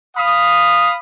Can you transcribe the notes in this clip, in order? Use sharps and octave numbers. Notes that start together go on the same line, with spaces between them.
F5 B5 D#6